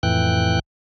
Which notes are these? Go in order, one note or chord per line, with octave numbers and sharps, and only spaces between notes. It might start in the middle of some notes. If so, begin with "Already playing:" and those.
F2 A2 E3 G5 F#6